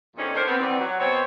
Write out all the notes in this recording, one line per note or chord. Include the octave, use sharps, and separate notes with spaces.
E2 A#2 D3 C4 C#4 D#4
D3 A3 G4 A#4 C5
B3 C4
D#3 E3 G3 B3 C4
F#3
B2 C4 C#5